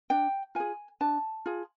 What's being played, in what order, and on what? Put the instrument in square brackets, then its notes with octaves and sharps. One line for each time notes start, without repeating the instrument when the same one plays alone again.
[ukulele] D4 G5
F4 G#4 G#5
D4 A5
F4 G#4